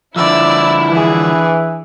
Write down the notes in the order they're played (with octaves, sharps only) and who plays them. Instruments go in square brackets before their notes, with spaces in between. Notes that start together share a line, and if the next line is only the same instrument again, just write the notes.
[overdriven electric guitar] D3 F3 [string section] E4 [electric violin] D5 E6
[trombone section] E3 [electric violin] D4 G#4